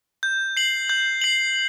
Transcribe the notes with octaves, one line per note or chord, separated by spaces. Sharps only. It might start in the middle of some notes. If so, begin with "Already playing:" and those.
G6
C7 F#7
G6
C7 F#7